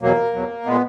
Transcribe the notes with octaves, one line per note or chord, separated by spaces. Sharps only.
E2 B2 F#3 A#3
E2 B2 F#3
A#2 G#3 B3